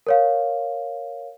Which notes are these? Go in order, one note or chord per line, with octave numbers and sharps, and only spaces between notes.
A#4 C#5 F5